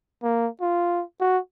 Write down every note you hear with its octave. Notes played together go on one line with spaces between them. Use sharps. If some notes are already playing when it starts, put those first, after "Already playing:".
A#3
F4
F#4